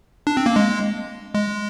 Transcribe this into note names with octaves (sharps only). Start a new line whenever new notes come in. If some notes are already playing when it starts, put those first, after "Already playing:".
D4
C4
A#3
G#3
G#3